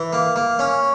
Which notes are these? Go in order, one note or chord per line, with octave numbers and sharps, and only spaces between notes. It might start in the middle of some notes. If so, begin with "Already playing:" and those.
Already playing: E3
A#3
A#3
C#4